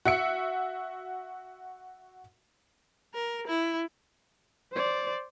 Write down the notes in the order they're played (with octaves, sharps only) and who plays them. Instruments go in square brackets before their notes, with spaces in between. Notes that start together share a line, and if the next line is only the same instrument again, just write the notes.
[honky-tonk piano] F#4 E5 C#7
[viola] A#4
E4
[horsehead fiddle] C5 D5